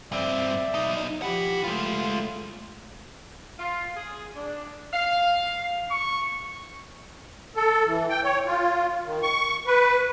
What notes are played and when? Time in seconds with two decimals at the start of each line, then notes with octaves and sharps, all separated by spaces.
0.12 G2 C4 D5 E5
0.74 B1 D#4
1.22 F3 E4 G4 F#5 B5
1.64 G#3 A3 F4
3.59 F4
3.97 G#4
4.35 D4
4.93 F5
5.91 C#6
7.56 A4
7.85 E3
8.10 G5
8.24 C#5
8.47 F4
9.06 D#3
9.22 C#6
9.67 B4